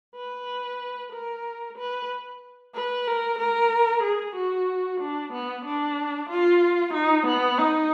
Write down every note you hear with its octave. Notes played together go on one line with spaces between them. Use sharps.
B4
A#4
B4
B4
A#4
A#4
G#4
F#4
D4
B3
D4
F4
D#4
B3
D#4